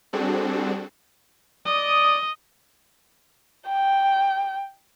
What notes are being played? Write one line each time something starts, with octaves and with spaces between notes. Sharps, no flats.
G3 C4 D4 F#4 G#4 A4
D5 D#5 D#6
G5